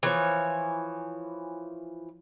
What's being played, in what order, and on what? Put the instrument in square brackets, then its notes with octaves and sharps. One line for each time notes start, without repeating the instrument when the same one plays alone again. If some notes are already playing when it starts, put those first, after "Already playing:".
[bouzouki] E3 F3 C#5